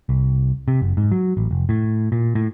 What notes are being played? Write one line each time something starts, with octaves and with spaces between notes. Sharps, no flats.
C2
C3
F#1
G#2
F#3
A1
F1
A2
A#2
A2